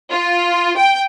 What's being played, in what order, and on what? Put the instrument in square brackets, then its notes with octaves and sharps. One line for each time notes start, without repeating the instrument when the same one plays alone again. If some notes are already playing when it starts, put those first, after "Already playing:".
[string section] F4
G5